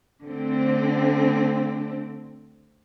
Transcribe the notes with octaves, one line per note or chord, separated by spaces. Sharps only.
D3 A3 C4